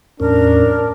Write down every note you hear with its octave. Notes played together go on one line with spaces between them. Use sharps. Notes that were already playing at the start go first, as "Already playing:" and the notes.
E2 A2 C#4 D4 A#4